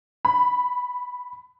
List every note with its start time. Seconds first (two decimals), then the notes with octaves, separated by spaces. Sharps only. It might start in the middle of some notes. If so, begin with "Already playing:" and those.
0.25 B5